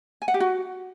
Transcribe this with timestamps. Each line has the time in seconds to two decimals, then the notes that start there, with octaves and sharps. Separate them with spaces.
0.22 G#5
0.28 F#5
0.34 G4
0.40 F#4